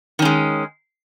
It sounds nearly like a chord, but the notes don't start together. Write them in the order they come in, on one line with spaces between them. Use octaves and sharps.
D#3 C#4 G#3